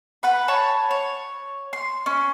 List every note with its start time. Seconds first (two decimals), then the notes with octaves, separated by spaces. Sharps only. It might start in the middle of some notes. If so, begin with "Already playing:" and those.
0.23 B4 F#5 B5
0.48 C#5 A5 B5
0.91 C#5
1.73 C6
2.06 C#4